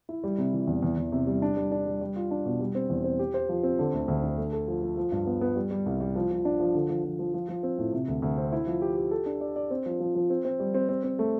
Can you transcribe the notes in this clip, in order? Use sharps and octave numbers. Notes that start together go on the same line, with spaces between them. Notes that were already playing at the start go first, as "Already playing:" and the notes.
E4
G3
C3
E3
E2
E2
E2
C3
G3
D4
G3
D4
G3
G3
F4
D4
B2
G3
C4
E2
C4
G4
C5
F3
C4
D3
D2
D2
D3
A3
A4
F3
F3
F3
G2
B3
B3
G3
G3
C2
G3
F3
F3
D4
F3
D3
F3
F3
F3
F3
F3
C4
A2
C3
D2
D2
C4
E4
F3
G4
G4
A4
D4
D5
D5
C4
F3
F3
F3
C4
C4
G3
C4
C4
C4
A3